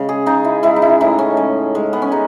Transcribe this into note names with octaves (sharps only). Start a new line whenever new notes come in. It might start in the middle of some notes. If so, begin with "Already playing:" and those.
Already playing: C#3 G#3
G#4
C#3 D#4
E4
G#3 E4
D#4
E4
A2 D#4
C#4
G#3
G#3
B3
C#4
G#3 D#4